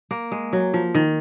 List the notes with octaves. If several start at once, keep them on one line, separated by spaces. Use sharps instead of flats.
A#3
G#3
F#3
F3
D#3